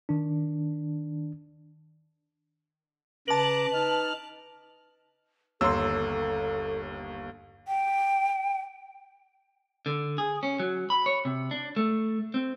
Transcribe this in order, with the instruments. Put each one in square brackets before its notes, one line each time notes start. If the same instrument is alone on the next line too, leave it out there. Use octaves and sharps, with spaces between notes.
[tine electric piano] D#3 D4
[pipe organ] C#3 A#5 D6 [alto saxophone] B4 [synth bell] A5 F#7
[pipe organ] D#4 F6
[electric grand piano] G1 E6 [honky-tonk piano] D#2 [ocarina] A4 [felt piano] C#5 A#5 C6
[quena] G5
[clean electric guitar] D3
G#4
C#4
F#3
B5
C#5
C3
D4
A3
C4